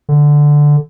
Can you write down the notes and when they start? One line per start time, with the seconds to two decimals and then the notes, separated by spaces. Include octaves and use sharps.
0.09 D3